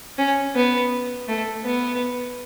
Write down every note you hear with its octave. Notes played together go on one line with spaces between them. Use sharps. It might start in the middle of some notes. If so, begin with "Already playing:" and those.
C#4
B3
A3
B3